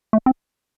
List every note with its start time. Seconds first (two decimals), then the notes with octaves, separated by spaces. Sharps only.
0.13 A3
0.26 C4